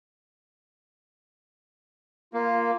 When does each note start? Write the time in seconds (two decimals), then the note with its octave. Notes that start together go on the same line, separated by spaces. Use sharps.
2.34 A#3 F4